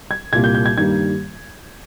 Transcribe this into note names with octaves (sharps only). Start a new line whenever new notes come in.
G#6
C2 A#2 G3 A#3 G#6
G6
G6
G#6
G2 D#3 G3 A#3 G#6